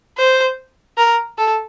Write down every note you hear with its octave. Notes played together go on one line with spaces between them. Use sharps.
C5
A#4
A4